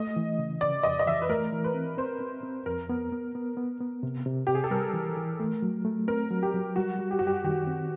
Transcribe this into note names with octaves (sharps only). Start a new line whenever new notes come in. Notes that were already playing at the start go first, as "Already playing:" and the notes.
Already playing: A3 D#5
E3
C#3
C#3 D5
F2 D#5
D#5
E3 E5
B4
A3 A#4
E3
B4
C4
C4 C5
C4
C4
F2 A#4
B3
B3
B3
B3
B3
C3
C3
C3 G4
G#4
A4
G3 A#4
E3
E3
A3
F#3
A3
C4 A#4
F#3
G4
F#3
G3 F#4
G3
G4
F#2 F#4
G4
D#3 G4
C4